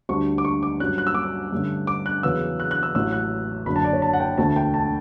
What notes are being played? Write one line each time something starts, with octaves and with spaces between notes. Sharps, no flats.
D2 D3 G3 D4 C#6
D6
C#6
D6
G2 F#3 C#4 F#6
F#6
E6
D6
E6
G2 D3 A3 C#4
D6
F#6
E2 C#3 F#3 B3 E6
F#6
F#6
E6
A1 A2 F#3 E6
F#6
F#1 F#2 D3 B5
A5
D5
C#5
A5
F#5
G5
E1 D2 D3 A3 A5
G5
A5